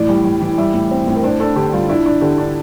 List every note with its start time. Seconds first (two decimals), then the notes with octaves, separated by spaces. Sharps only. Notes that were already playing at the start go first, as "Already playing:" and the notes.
Already playing: A2 E3 D5
0.09 G3
0.24 G3
0.41 E3
0.58 G3 E5
0.73 A2
0.91 C4
1.07 A2
1.16 A#4
1.23 D4 C5
1.40 D4 A4
1.56 D3 G4
1.73 G3 F4
1.89 D4 E4
2.06 D4
2.21 D3 G4
2.38 D4